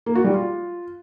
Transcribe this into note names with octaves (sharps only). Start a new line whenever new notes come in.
A#3
F#4
G3
F4